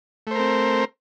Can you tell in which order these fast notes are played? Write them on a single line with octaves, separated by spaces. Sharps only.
A3 C5 A#4 C4